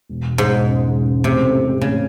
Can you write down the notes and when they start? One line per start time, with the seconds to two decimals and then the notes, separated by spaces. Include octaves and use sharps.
0.09 E1
0.29 E1
0.38 G#2
0.48 E1
0.68 C#3
0.87 E1
1.05 C#3
1.24 A1 C3
1.44 A2
1.62 G#3
1.81 A1 C#3